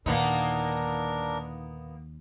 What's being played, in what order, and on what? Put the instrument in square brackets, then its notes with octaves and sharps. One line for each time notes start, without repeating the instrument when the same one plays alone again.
[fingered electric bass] D#2 [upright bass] A#2 D3 [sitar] A#3 B3 D#4 [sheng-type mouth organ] D4 A#4